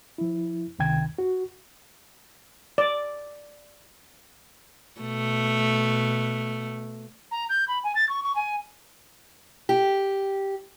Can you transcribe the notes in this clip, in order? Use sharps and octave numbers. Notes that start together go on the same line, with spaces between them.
F3 E4
C#2 C3 D#3 G5 G#6
F#4
D5
B2 A3
A#5
G6
B5
G#5
A6
C#6
C#6
G#5
G4